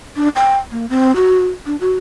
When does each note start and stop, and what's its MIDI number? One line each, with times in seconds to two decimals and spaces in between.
0.17 0.29 62
0.36 0.57 79
0.71 0.86 58
0.90 1.14 60
1.16 1.47 66
1.66 1.76 62
1.81 1.96 66